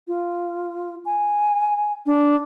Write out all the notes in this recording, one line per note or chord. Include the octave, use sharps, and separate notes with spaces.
F4
G#5
D4